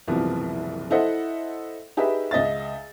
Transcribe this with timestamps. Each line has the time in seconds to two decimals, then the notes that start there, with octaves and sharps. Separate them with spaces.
0.07 F#1 C2 B2 E3 F3
0.90 E4 A4 C5 D#5 E5 F#5
1.97 D#4 G4 G#4 B4 E5
2.31 C#2 D#5 E5 A6